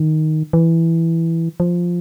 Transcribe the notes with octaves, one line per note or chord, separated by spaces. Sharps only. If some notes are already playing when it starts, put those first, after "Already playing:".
Already playing: D#3
E3
F3